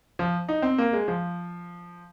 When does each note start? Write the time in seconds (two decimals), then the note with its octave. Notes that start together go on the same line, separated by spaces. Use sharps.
0.19 F3
0.48 D#4
0.62 C4
0.78 A#3
0.93 G#3
1.08 F3